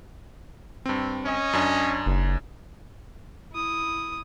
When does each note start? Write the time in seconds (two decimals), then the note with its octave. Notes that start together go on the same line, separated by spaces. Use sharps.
0.86 G2 C4
1.25 C#4 D#5
1.53 F#2 D4
2.06 F#1
3.52 E4 D#6